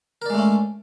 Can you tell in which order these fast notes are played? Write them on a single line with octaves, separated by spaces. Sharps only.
A#4 D5 G#3 A3 C#4